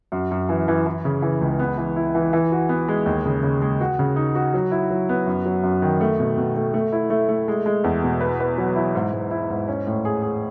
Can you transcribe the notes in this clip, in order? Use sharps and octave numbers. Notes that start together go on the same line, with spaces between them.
F#2
F#2
E3
E3
E3
C#3
E3
C#2
B3
E3
E4
E3
E3
F#4
B3
G#3
D#2
C#3
C#3
G#3
F#4
C#3
D#4
F#4
F#3
E4
F#3
B3
F#2
F#3
F#2
D#3
A3
B2
B2
A3
A3
E4
A3
A3
G#3
G#3
E2
B2
B4
B4
F#3
E4
G#2
G#2
E4
G#2
C#4
A2
G#4
G#4